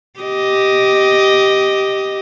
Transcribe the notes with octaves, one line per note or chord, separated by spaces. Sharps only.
G4 D#5